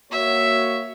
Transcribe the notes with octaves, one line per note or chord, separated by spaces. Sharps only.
A#3 F#4 C#5 E5